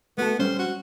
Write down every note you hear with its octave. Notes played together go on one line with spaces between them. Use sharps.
A3 B3 F#4 A4
G3 C#4 C5
F#4